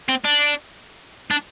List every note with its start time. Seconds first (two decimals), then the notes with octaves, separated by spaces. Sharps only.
0.09 C4
0.24 D4
1.31 D4